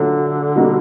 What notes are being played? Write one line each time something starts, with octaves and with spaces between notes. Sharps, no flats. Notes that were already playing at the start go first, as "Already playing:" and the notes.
Already playing: A#2 D3 F#3 A3 D4 F#4
B2 G3 A#3 D#4 F#4